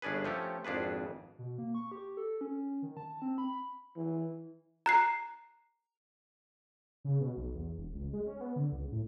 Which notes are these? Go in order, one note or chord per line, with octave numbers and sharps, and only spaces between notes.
G1 C#4 D4 G#4 B4
F3 A3 C#4 G4
G#1 F2 D4 G#4 B4
B2
A#3
C#6
G4
A4
C#4
D#3
A5
C4
B5
E3
A#5 F#6 C7
C#3
B2
B1
E2
E1
C#2
G#3
C#4
B3
D3
C#2
A2